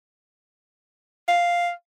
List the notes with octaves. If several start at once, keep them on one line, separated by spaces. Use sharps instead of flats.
F5